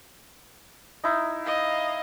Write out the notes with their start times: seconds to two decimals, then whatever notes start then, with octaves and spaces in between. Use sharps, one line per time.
1.04 D#4 E4
1.43 D#5 F5